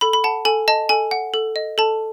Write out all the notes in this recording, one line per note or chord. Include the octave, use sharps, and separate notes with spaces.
A4 B5
B5
F#5 A5
A4 G#5
D#5 A5
A4 G#5
F#5
A4
D#5
A4 A5